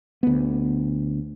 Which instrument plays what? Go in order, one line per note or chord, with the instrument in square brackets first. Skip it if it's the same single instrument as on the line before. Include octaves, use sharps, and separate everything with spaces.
[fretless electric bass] D2 B3